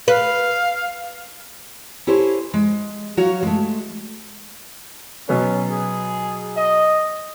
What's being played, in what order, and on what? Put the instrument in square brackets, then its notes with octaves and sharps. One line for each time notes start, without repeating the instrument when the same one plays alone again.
[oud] B4 [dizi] F5
[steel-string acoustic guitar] E4 G4 A4 C5 C#5 G#5
G#3
F#3 F#4 C#5 F5
G#3 A3
[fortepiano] B2 F#3 B3 [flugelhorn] C#4
[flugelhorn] G#4
D#5